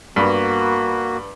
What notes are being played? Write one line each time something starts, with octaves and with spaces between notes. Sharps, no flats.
G2 A#3 B3 F#4